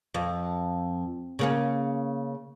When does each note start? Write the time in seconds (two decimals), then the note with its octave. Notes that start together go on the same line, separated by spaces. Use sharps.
0.14 F2
1.39 C#3 A#3 C#4